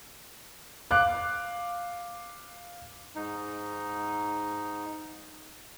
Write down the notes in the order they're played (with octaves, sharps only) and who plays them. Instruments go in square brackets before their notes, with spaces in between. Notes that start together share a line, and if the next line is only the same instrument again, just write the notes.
[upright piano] F5 D6 F#6
[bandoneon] G#2 D#4